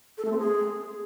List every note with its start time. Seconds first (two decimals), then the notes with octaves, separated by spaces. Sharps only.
0.18 A4
0.25 A3
0.32 C4
0.39 G#4